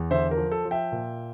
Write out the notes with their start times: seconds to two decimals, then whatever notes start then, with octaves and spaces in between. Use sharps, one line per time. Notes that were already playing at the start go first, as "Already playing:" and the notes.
Already playing: E2
0.11 D3 C5 E5
0.31 A#4
0.37 F3
0.52 A4
0.65 F3
0.71 E5 G5
0.92 A#2